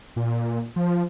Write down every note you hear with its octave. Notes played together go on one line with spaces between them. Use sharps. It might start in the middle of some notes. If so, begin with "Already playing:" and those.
A#2
F3